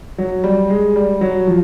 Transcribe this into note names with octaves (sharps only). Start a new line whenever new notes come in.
F#3
G3
G#3
G3
F#3
F3